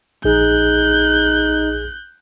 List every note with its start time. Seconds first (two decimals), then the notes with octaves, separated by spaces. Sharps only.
0.24 A#1 D#4 G#4 F#6 G6